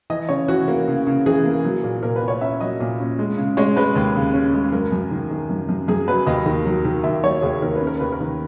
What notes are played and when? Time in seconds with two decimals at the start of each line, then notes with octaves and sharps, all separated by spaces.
0.10 E3 D#5
0.29 C#3 C#5
0.48 E3 F#4
0.68 A#3
0.88 C#3
1.07 C#3
1.26 E3 G#4
1.44 A#3
1.65 F#3
1.84 A#2
2.03 A#2 A#4
2.16 B4
2.22 A#2
2.28 C#5
2.41 C#4 E5
2.61 F#3 D#5
2.80 A#2
3.00 C#4
3.19 G#3
3.38 C#3
3.57 G#3 C#5
3.76 G#3 B4
3.95 D#2
4.15 C#3
4.34 C#4
4.53 G#3
4.72 F#2 A#4
4.92 F#2
5.11 D#3
5.30 D#3
5.49 F#2
5.69 F#2
5.88 F#2 G#4
6.08 F#3 B4
6.27 D#2 D#5
6.46 D#3
6.66 F#3
6.85 D#3
7.03 D#2 E5
7.24 F#3 C#5
7.42 D#2 G#4
7.62 D#3 A#4
7.75 B4
7.81 C#4
7.87 A#4
8.00 D#2 B4
8.12 A#4
8.20 D#3